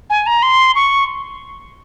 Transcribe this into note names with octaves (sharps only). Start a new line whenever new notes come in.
G#5
A#5
C6
C#6